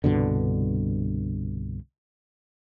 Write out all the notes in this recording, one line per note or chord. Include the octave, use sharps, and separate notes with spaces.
C2 G2 B2 D3